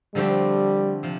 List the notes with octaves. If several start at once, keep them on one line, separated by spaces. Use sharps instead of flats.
D3 F3 G3 A3 C4 G4
C3 F3